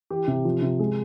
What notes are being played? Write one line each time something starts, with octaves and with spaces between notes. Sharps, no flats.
E3 G4
C3
F3
C3
G#3